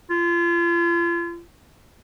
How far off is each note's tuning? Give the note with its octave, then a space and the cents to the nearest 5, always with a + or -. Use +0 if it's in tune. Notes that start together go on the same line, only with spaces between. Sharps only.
F4 -35